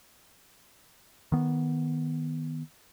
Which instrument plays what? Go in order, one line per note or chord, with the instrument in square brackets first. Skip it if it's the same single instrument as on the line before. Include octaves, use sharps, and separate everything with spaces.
[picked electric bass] D#3 B3